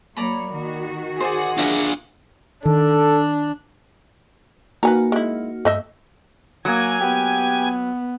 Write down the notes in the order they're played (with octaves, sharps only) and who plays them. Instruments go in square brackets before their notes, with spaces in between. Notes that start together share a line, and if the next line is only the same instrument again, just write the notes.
[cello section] F#3 A#3 C#5 [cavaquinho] D5 A#5 B5
[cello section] D#3 F#4
[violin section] G#4 F#5 [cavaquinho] C5 D5
[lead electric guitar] D4 F4 [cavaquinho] A#4 E5
[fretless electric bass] D#3 [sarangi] D4 [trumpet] A4
[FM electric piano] A#3 D#4 F#4 [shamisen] B4 G#5 A#5
[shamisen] G#3 E4
[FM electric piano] G2 [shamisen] A3 D#5 E5
[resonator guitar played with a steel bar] F#3 [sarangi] A#3 [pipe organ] G#5
[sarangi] B3 [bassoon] G4